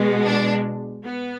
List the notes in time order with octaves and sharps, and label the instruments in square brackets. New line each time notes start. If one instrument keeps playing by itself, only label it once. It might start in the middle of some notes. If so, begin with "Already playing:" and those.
Already playing: [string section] B2 G#3
D4
B3